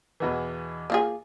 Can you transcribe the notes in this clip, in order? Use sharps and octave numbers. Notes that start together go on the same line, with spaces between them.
E2 B2 E3
A#3 F4 G#4